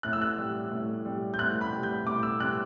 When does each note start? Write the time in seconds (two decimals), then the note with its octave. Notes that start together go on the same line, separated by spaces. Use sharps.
0.03 A2 F#6
0.13 E6
0.22 F#6
0.38 G3
0.71 A2
1.05 G3
1.34 G6
1.39 A2 F#6
1.61 B5
1.72 G3
1.83 G6
2.06 A2 D6
2.23 E6
2.40 G3 F#6